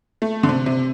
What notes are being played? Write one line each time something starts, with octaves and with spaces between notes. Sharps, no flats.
A3
D3
C3
C3